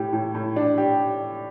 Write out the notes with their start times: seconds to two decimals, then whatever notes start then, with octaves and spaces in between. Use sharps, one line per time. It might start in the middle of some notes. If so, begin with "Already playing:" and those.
Already playing: A2 G4
0.13 A2
0.35 A2
0.56 D4
0.78 G4